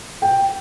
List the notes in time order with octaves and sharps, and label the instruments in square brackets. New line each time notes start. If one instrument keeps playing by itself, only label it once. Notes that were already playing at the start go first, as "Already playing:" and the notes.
[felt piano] G5